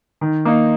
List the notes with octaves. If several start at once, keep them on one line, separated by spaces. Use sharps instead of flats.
D#3
A#3 D#4